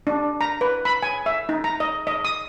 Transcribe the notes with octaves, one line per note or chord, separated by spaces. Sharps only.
D4
A#5
B4
B5
G#5
E5
D#4
A#5
D#5
D#5
D#6